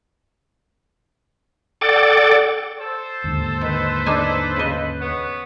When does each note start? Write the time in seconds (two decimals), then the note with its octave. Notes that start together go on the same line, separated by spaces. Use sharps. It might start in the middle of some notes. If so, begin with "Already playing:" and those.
1.81 A4 D5 F#5 G5 D6 A6
2.79 A4 C5
3.24 D#2 G#2 D3
3.61 D#3 B4
4.06 D4 D#4 G#5
4.56 C#3 D#5
5.00 B3 C#5